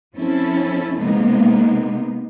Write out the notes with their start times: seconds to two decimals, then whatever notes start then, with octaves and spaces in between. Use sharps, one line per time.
0.16 F3 C4 C#4 E4 A4
0.99 C3 G#3 A#3 B3 D#4